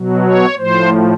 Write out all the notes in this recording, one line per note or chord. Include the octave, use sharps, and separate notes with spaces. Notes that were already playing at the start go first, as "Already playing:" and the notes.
Already playing: B2 F#3
C#5
A2 F3 C5